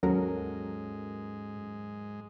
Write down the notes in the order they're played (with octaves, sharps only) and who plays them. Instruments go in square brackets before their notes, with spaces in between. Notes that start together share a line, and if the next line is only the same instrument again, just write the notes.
[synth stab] D#2 F#3 A#4 [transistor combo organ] G#2 G#3 [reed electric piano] C#4 F#4 A4